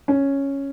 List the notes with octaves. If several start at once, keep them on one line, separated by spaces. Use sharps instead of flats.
C#4